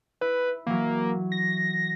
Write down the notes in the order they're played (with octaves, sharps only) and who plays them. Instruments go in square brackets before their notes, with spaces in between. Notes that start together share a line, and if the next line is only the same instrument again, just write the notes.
[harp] E4 [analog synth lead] B4
[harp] E3 F#3 [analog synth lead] A#3
[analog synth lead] A#6